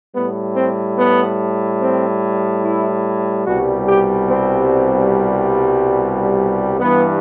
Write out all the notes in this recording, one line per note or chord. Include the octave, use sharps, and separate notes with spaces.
A2 G3 B3
C4
B3
C4
E4
C2 B2 G3 F#4
G4
C4
G2 E3 G3 B3